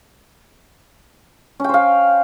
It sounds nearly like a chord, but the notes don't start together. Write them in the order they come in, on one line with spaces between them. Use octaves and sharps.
C#4 G5 C5 F5